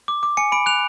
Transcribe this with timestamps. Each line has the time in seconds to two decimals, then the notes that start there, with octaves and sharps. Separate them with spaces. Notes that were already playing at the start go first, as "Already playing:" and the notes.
0.08 D6
0.23 D6
0.37 G#5 C#7
0.52 B5 D7
0.66 F#6 F7